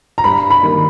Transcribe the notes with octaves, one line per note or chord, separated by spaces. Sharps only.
A#5
G2 B5
B5
D#3 G3 A#3